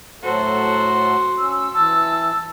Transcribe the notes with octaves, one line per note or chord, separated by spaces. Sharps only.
A2 F#3 F#4 A4 C5
C#4 E6
E3 A5